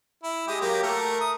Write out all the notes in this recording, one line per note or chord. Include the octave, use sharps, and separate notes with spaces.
E4
G#3 G4 D#6
F#3 A#3 G4
A3 A#4
D#6